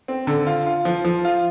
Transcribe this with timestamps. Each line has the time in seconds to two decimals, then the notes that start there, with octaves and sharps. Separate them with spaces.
0.08 C4
0.27 D3
0.46 F4
0.67 F4
0.85 F3
1.04 F3
1.25 F4